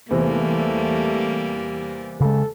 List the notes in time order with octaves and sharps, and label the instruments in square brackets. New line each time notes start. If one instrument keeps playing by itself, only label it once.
[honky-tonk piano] E2 C3 [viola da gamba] G3 A#3 [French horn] A3
[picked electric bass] C#3 G#3 [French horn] A4